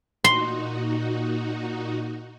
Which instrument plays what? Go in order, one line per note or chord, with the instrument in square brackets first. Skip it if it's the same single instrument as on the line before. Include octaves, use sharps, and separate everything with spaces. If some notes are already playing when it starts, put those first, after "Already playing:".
[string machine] A#2 D#4 F#4 [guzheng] C6